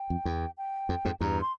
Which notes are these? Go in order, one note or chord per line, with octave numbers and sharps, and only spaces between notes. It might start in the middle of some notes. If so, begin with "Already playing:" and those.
Already playing: G5
F2
E2
G5
F2
F2 G#2
E2 G2 A#5
C6